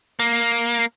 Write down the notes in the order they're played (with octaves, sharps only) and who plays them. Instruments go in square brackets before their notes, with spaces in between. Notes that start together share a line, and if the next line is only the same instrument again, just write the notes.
[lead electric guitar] A#3